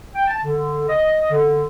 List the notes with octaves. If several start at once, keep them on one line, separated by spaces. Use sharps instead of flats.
G5
A5
D3
D#5
D3